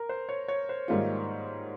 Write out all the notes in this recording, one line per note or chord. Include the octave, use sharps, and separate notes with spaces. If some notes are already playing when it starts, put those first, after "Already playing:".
Already playing: A#4
C5
C#5
C#5
C5
G#2 D#3 G3 A#3 F4